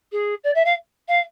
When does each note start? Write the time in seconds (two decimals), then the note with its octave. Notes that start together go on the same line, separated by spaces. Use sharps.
0.12 G#4
0.43 D5
0.54 E5
0.65 F5
1.08 F5